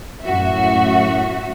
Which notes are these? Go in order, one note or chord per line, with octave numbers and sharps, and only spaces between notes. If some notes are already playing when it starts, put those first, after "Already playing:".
F#2 A2 F#4 E5